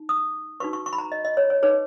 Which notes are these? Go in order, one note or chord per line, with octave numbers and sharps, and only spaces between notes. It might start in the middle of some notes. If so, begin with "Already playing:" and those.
Already playing: D#4
D#6
D#4 F#4 B4 C#6
C#6
C#6
B5
A#5
D#5
D#5
C#5
C#5
D#4 G#4 B4 C#5